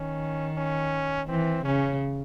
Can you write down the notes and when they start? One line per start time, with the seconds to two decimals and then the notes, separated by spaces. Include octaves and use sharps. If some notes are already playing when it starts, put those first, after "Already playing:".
Already playing: D#3 C#4
0.57 C#4
1.29 E3 C4
1.65 C#3 C#4